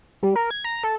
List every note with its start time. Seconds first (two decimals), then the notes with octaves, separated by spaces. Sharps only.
0.23 G3
0.36 A#4
0.51 G#6
0.64 A#5
0.84 A4